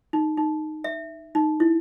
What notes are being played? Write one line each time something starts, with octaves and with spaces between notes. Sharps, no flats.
D#4
D#4
E5
D#4
E4